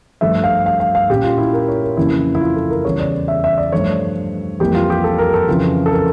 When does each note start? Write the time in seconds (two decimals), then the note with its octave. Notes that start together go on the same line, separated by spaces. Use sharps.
0.21 G2 F3 A3 E5
0.44 F5
0.66 F5
0.80 F5
0.95 F5
1.09 A#2 G3 C#4 G4
1.24 F4
1.38 E4
1.53 A#4
1.68 C#5
1.83 A#4
1.97 F2 C#3 E3 A#3 C#4 E4
2.35 E4
2.41 F4
2.56 A4
2.70 A#4
2.85 E2 C#3 G3 C#5
2.99 D5
3.28 E5
3.44 E5
3.58 D5
3.72 G2 F3 A3 C#5
4.60 F2 E3 G3 A#3 G4
4.75 F4
4.90 G4
5.04 A4
5.18 A#4
5.33 A4
5.48 F2 C#3 E3 F4
5.86 A4
5.91 A#4